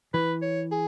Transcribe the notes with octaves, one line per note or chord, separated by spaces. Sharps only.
E3 B4
C#5
G#4